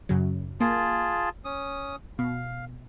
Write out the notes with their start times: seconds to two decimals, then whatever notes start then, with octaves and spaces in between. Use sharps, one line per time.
0.09 F#2 C#3 F#3
0.61 A#3 F4 G#4 A5
1.45 C#4 D#6
2.19 B2 F5